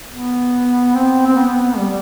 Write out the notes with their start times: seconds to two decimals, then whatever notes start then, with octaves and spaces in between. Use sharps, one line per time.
0.11 B3
0.95 C4
1.27 C4
1.36 B3
1.77 G3